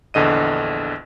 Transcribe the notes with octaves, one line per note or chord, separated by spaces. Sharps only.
A#1 E2 D3 D#5 D#7